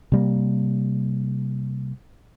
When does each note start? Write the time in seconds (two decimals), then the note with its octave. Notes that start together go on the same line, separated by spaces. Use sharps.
0.12 C3 G3 A#3